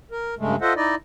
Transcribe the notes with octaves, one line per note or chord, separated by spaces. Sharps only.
A#4
G2 C#3 G#3 A3
F4 A4 C5 D#5 E5 F#5
D#4 E4 D5 D#5